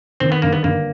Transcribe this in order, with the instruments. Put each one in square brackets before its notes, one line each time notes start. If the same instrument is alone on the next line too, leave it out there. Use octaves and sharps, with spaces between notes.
[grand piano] D#3 [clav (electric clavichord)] C4
[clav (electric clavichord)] B3
[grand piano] G1 [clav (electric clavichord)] A#3
[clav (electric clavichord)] B3
[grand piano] G1 [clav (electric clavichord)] A#3